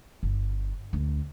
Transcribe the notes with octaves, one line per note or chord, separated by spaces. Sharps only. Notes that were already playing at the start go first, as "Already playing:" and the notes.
G1
D2